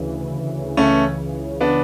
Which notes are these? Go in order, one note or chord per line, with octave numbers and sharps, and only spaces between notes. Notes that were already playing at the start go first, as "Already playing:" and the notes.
Already playing: D2 C#3 E3
C#2 C#3 E3 A3 C#4
B3 D4